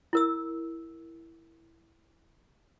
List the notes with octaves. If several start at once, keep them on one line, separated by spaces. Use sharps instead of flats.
E4 A#4 E6